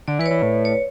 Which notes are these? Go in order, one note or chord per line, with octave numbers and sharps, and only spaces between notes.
D3 D5
E3 B4
C#5
E3
A2
C#5